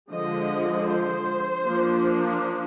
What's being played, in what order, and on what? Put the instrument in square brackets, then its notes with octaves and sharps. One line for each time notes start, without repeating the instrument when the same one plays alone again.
[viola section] D3 F3 G#3 D#5
C5
F3 A#3 D4